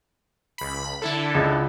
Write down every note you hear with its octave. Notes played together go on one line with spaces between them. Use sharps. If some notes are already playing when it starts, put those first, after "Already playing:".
C#2 B5
D3 E4 A4
C#2